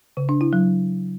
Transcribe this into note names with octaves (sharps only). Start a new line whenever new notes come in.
C#3
D4
E4
F#3